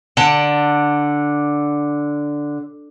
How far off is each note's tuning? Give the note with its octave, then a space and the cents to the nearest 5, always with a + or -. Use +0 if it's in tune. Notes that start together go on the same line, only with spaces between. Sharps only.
D3 +0 D5 +0 A5 +25